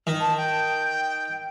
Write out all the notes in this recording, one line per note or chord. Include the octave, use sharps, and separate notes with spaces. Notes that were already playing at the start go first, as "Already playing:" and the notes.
D#3
A5
G5